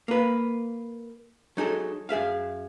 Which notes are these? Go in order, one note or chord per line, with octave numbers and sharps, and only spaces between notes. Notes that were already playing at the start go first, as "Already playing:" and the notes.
A#3 B4
F#3 D#4 G#4 A4
F#2 G#4 E5 F5